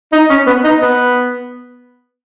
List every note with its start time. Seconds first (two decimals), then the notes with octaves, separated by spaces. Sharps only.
0.12 D#4
0.30 C#4
0.47 B3
0.64 D#4
0.81 B3